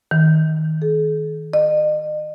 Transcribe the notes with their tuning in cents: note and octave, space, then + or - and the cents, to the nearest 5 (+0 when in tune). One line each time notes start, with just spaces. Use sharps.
D#3 +20
G#4 +45
D#5 -40